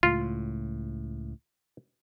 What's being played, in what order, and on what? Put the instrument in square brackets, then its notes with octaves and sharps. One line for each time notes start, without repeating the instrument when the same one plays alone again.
[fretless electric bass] C#2 A2 [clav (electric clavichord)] F4